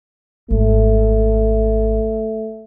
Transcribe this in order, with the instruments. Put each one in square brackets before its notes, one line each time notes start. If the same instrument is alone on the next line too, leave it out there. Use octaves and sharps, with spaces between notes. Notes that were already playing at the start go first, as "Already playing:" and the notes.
[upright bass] G#1 [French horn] A3